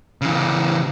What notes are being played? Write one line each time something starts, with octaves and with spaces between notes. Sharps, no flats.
C#3 E3